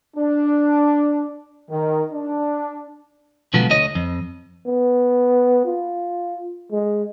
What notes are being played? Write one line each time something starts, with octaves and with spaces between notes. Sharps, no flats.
D4
D#3
D4
B2 D3 F3 F#3 G#3 B3
D2 D3 C#5 D#5
F2
B3
F4
G#3